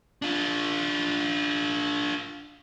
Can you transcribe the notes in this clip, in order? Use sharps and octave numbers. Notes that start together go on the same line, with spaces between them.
D4 F4